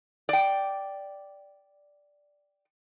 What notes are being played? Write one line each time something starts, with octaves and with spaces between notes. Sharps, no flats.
D5 G5